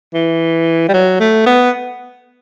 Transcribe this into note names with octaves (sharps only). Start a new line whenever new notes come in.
E3
G3
F#3
A3
B3